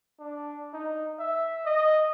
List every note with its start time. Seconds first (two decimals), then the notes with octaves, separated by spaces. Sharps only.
0.19 D4
0.74 D#4
1.19 E5
1.66 D#5